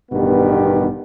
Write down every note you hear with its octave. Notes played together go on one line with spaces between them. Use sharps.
A1 G2 B2 D#3 B3 G4